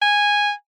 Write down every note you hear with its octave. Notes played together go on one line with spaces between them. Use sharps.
G#5